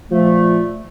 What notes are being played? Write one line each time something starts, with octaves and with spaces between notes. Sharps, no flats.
A#2 F3 A3